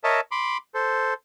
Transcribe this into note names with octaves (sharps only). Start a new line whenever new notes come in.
A#4 C#5 D#5 E5 A5
B5 C6 D6
A4 C5